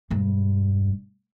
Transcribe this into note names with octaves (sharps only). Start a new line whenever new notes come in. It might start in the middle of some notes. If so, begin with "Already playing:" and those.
E1 G2